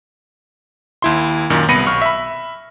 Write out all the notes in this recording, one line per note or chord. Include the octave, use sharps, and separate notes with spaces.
D#2 E4 C6
F#2 A#2 D#3
C2 B3 B5 A#6 C#7 D#7
B1 C#6 F6
E5 B5